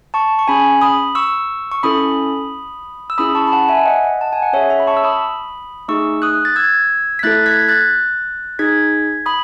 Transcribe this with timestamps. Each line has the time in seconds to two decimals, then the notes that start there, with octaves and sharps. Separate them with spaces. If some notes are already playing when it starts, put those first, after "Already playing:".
0.14 A5 C#6
0.39 C#6
0.48 C#4 G#4 G#5 B5
0.81 B5 D#6
1.15 C#6 E6
1.72 C#6
1.83 C#4 E4 A4 B5 D#6
3.10 E6
3.18 C#4 E4 G#4 B5 D#6
3.35 A5 C#6
3.47 B5
3.52 F#5 A5
3.68 E5 G#5
3.85 D#5 F#5
4.21 A5
4.33 G#5
4.42 F#5
4.53 C#4 G#4 C#5 E5
4.70 C#5 E5
4.80 B5
4.87 A5 C#6
4.97 E6
5.04 B5 D#6
5.88 A3 D#4 G#4 C#6 E6
6.22 D#6 F#6
6.45 A6
6.56 E6 G#6
7.19 B6
7.23 A3 E4 A4 F#6 A6
7.46 G#6 B6
7.69 F#6 A6
8.59 D#4 G#4 G#6 B6
9.26 B5 D#6